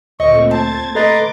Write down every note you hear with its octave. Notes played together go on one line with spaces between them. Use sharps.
D2 A#2 A3 C4 D#5 C#6
C5 A5 G#6 A6
A4 B4 D#5 A#5 C6 D6 A6